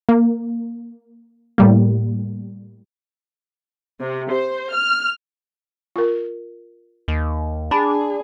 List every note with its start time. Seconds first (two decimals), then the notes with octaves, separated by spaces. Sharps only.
0.09 A#3
1.58 A2 G3 A#3
4.01 C3
4.31 C5
4.73 F6
5.96 F4 A#4
7.08 D#2
7.71 D4 G#4 A5 B5